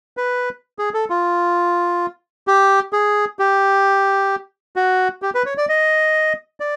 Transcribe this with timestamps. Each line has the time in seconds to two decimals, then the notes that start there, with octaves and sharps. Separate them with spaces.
0.17 B4
0.79 G#4
0.94 A4
1.10 F4
2.47 G4
2.93 G#4
3.39 G4
4.76 F#4
5.22 G4
5.35 B4
5.46 C#5
5.58 D5
5.69 D#5
6.60 D5